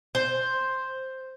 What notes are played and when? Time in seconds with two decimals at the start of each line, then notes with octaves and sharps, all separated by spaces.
0.15 C5